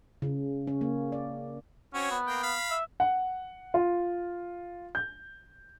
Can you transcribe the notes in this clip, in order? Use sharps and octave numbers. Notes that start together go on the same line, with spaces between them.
C#3
C#4
A#3
D5
C4 C#4 F#4 C#5
B3
A#3 G5
F5 B5
E5
F#5
F4
G6